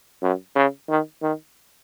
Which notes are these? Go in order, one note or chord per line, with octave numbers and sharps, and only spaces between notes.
F#2
C#3
D#3
D#3